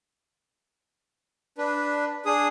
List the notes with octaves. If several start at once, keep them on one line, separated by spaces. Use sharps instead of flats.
D4 B4
D4 G#4 D#6